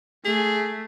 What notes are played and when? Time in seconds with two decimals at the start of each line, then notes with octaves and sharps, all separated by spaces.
0.25 A3 G#4